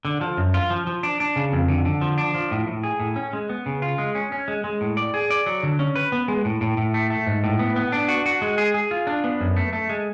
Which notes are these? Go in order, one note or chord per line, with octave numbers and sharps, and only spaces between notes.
D3
F3
F#2
F4
F3
F3
D4
D4
C#3
F2
D3
D3
F3
D4
F3
A2
A2
G#4
A2
C#4
G#3
B3
C#3
F4
G#3
C#4
C#4
G#3
G#3
A2
D5
G#4
D5
F#3
D3
C#4
B4
B3
G#3
A2
A2
A2
A3
A3
G#2
A2
B3
B3
D4
F#4
F#4
G#3
G#4
G#4
F4
D4
B3
F#2
A3
A3
G#3